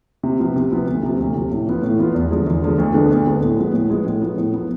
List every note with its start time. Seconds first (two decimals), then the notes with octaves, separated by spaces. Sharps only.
0.23 C3
0.40 F3 B3 F4
0.56 C3
0.72 F3 B3 F4
0.87 D2
1.03 C3 F3
1.19 D2
1.35 C3 F3
1.51 A2
1.67 E3 B3 F4
1.83 A2
1.99 E3 B3 F4
2.14 E2
2.31 D3 F3 G#3
2.47 E2
2.62 D3 F3 G#3
2.78 D2
2.94 D3 G#3 B3 D4
3.10 D2
3.26 D3 G#3 B3 D4
3.42 A2
3.58 F3 G#3 B3
3.73 A2
3.90 F3 G#3 B3
4.06 A2
4.22 F3 B3
4.37 A2
4.54 F3 B3